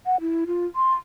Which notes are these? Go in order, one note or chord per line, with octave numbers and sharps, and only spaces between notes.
F#5
E4
F4
C6